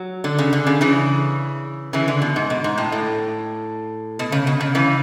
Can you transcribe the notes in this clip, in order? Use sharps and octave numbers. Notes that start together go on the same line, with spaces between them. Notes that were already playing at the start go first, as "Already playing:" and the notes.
Already playing: F#3
D3
C#3
D3
C#3
C#3 E3
C#3 E3
D3
B2
G#2
B2
G#2
A2
A2
B2
C#3
B2
C#3
C#3 E3